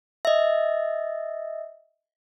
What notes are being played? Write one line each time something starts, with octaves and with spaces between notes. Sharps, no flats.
D#5 E5